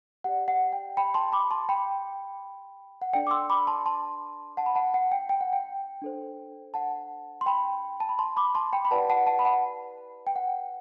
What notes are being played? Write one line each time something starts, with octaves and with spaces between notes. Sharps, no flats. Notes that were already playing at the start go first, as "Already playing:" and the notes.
G4 D5 F#5
F#5
G5
G5 B5
A5 C6
B5 D6
A5 C6
G5 B5
F#5
D4 A4 D5 G5
D6
C6 E6
B5 D6
A5 C6
A5 C6
F#5 A5
B5
F#5 A5
F#5
G5
G5
F#5
G5
D4 A4 C5
F#5 A5
C6
G5 B5
A5
B5
A5 C6
B5 D6
A5 C6
G5 B5
B5
E4 G4 B4 D5 F#5 A5
F#5 A5
F#5 A5
B5
F#5 A5
G5
F#5